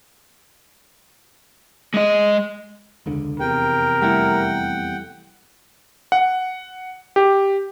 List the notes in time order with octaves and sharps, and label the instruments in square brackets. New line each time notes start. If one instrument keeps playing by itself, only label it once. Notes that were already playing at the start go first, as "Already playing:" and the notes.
[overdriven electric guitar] G#3 D#5
[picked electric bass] E1 C#2 D3
[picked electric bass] F1 E2 C3 [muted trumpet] A#4 [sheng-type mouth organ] G5
[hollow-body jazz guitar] G3 A3 E4 [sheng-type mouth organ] F#5 G5
[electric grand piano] F#5
G4